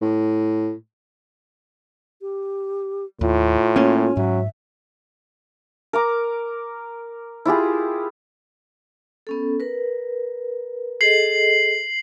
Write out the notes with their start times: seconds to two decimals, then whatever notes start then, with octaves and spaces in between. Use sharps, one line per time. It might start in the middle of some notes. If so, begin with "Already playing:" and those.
0.02 A2
2.22 G4
3.21 D#2 A2 F4
3.76 A3 A#3 C#4
4.17 G#2 F#3 E5
5.93 A#4 A#5 D6
7.45 E4 F4 G4 G#4
9.27 B3 C#4 A4
9.60 A#4 B4
11.01 G#4 A4 D#5 C7 F#7